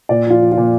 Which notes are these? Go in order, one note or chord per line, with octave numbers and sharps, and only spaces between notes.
A#2 D5
F3 F4
F3
F4
A#2